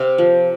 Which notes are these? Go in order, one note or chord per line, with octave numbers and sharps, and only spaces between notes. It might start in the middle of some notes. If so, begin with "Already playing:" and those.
Already playing: C3 F5
F3